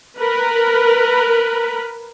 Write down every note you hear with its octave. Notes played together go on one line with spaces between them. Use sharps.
A#4 B4